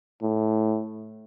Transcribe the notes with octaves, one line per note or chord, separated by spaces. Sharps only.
A2